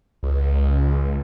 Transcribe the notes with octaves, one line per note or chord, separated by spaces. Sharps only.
C#2